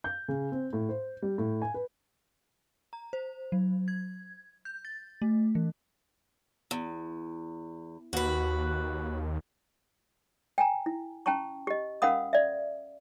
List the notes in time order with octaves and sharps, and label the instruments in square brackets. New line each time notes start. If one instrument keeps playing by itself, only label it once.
[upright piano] G6
C#3
C4
A2
C5
G3
A2
G#5
B4
[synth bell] A#5
C5
F#3
G#6
G6
A6
A3
E3
[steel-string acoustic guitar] E2
[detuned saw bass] D#2 [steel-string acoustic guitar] F#4 B4
[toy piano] G5 G#5 A#5
E4
C#4 G5 A5 A#5 C#6
G4 D#5
C#4 A#4 F5 F#5 B5 D#6
D5 E5